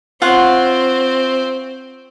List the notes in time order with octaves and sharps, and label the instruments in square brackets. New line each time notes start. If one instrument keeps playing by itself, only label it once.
[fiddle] C4 [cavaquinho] F4 C#5 F#5